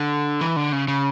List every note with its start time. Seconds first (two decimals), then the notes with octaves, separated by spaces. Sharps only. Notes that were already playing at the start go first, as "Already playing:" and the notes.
Already playing: D3
0.41 E3
0.56 D3
0.72 C#3
0.88 C#3